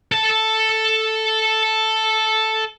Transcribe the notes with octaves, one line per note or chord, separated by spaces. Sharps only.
A4 A5